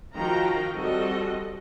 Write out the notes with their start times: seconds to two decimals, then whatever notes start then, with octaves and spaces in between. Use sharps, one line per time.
0.16 D#3 F3 F#4 F5 G5 A#5
0.77 G3 C4 F#4 A4 D#5